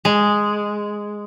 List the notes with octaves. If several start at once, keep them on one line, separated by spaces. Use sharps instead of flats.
G#3